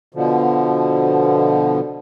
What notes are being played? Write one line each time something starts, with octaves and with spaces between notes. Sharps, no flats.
B2 D3 F3